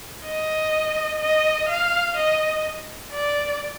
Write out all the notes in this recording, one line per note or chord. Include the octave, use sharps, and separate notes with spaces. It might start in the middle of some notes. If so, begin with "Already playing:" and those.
D#5
D#5
F5
D#5
D5